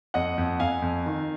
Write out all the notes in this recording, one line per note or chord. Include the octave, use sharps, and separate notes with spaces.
F2 D#5 F#5
F2
F2 F5 G#5
F2
D#3